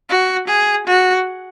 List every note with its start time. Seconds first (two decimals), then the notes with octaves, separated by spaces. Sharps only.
0.10 F#4
0.48 G#4
0.87 F#4